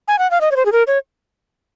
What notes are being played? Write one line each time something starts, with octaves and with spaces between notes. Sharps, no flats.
G#5
F#5
F5
D#5
C#5
C5
G#4
A#4
C#5